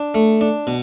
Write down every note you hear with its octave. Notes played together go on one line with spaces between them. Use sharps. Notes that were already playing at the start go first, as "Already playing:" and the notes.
Already playing: D4
A3
D4
B2